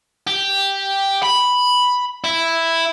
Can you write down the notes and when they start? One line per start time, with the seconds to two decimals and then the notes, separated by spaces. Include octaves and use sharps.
0.28 G4
1.22 B5
2.24 E4